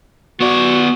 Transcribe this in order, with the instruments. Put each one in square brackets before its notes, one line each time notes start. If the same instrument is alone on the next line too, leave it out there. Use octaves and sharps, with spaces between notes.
[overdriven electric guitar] B3 D5 [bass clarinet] F#4